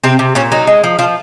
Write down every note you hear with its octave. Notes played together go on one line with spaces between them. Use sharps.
C3 C4
C3
A#2 C#4
F#3 D#4
G#3
F3
F3 F4